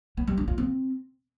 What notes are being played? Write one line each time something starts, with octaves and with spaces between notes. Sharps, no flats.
B3
G3
D4
F4
C4